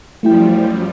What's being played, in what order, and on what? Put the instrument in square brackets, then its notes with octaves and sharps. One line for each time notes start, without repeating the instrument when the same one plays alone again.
[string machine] F#2 F3 G3 [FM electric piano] A3 E4 G5